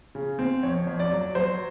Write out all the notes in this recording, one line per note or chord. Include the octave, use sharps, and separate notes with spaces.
C#3
C4
F2 C#5
F2
D5
F#3
F#3 C5